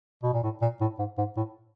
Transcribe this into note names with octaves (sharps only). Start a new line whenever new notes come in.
B2
A#2
A2
A#2
A2
G#2
G#2
A2